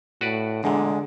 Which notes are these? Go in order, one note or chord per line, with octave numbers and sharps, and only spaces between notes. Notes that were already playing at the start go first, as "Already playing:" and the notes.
A2 F#4 B4 D5
E2 A#2 D3 G#3